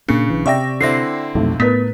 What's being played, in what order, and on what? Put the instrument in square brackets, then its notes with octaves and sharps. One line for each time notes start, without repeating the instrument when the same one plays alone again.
[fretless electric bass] A#2 A#3 [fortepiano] C#3 [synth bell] D4 C#7
[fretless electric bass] B1 E3
[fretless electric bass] C3 [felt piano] D5 E5 G5 [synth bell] C#6 A#6
[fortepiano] D3 C4 E4 [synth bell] A#6 C7
[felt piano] B1 C3 [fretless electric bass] F2 F#3 A3
[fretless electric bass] A2 [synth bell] B3 [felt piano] A#4 B4 B6